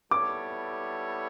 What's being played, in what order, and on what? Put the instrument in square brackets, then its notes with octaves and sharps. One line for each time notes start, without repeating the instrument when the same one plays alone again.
[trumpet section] G3 B3 E4 A4 C#5 [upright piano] D6